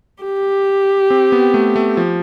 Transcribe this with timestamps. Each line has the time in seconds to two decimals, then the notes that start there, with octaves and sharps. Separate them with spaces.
0.23 G4
1.10 C4
1.32 B3
1.54 A3
1.76 A3
1.97 F3